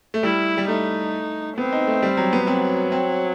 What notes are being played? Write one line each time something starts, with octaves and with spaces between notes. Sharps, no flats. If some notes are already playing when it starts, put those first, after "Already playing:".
A3
G3 E4
G3
A3 D#4
B3 C4
D#4
A3
G3
F#3
B3
F#3 C4
C4